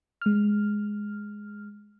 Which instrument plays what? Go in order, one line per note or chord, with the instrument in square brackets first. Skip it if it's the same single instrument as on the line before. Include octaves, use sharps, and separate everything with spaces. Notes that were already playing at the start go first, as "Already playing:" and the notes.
[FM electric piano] G#3 F6